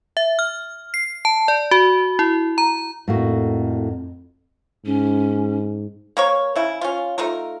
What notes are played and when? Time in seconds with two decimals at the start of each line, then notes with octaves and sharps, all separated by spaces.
0.17 E5
0.39 F6
0.94 C7
1.25 A5
1.48 D5
1.71 F#4
2.19 E4
2.58 A#5
3.08 F2 A2 A#3 F#4
4.85 G#2 C#4
6.17 A#3 A#4 C#5
6.56 C#3 E4
6.81 C#4 F4
7.18 A3 D#4 F4 A#4